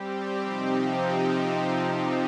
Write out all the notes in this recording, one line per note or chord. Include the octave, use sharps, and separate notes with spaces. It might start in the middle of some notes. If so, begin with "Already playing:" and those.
Already playing: G3 C4 G4
C3 F3 C4 D#4 G4